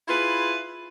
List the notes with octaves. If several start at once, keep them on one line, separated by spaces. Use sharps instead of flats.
E4 F4 G#4 B4